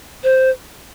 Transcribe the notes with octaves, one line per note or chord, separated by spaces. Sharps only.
C5